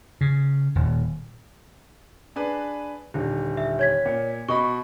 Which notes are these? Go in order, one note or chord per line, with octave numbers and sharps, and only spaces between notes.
C#3
D#1
D4 G#4 B4
D#1 D3
E5
C#5 G#6 B6
A#2
B2 D#5 B5 C#6